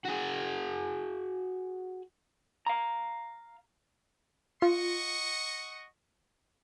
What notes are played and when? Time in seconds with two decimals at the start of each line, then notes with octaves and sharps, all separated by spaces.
0.05 F#4 G#4
2.66 F5 A#5
4.62 F4 D#5 F#5 C#6